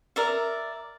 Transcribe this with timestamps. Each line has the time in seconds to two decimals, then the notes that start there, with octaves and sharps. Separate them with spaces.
0.16 A#4 D5 E5